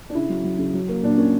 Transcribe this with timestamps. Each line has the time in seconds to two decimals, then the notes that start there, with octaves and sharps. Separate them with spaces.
0.10 D4
0.15 C#3 E4
0.30 F#3
0.44 F#3
0.59 C#3
0.74 F#3
0.89 A#3
1.03 A#2 D4
1.18 A#3 C#4